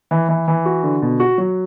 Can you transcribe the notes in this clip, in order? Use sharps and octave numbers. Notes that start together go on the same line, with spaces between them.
E3
E3
E3
F#4
D3
B2
F#4
F#3